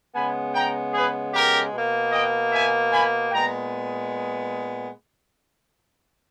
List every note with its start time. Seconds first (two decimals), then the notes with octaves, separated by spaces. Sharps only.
0.14 C#3 G#3 B3 G#5 B5
0.54 G5 A#5
0.93 G#4 B4
1.33 G4 A#4
1.74 B2 A#3
2.12 D#5 G5
2.52 E5 G#5
2.91 G#5 B5
3.31 A#2 G#3 B3 G5 A#5